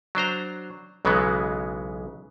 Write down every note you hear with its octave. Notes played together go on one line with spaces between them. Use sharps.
F#3 D4 C5 A#5
B1 C#3 E3 F#3 G#3 B3